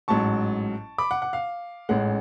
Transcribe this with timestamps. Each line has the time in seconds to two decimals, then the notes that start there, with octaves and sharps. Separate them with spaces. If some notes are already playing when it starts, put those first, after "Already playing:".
0.08 A1 G#2 F#3 A5 C#6
0.98 B5 D6
1.11 F#5
1.22 F#5
1.33 F5
1.89 A1 G#2 G#3 C#4 F#5